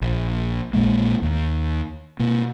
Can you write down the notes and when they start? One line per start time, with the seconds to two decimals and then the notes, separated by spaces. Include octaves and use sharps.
0.01 A#1
0.73 A#1 A#2 G#3 A#3
1.22 D#2
2.19 B2 A#3